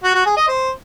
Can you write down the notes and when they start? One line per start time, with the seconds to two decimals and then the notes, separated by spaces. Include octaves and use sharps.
0.03 F#4
0.15 F#4
0.26 G#4
0.37 D#5
0.48 C5